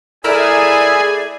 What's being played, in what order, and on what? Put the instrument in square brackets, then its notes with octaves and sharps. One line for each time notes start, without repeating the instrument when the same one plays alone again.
[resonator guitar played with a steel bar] A3 A#4 A#5 [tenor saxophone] E4 [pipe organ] G#4 G#5 [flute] D5